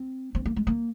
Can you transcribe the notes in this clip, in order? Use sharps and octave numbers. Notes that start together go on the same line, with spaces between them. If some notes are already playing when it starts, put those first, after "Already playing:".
Already playing: C4
C4
A#3
G#3
A#3